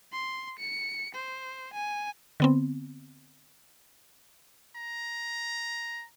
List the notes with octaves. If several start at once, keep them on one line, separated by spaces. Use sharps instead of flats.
C6
C#7
C5
G#5
D3 B3 C4
A#5